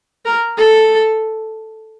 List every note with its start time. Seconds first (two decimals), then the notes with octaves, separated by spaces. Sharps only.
0.25 A#4
0.58 A4